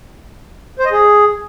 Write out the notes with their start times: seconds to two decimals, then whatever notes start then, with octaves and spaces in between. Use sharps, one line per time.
0.79 C5
0.85 D#5
0.91 G#4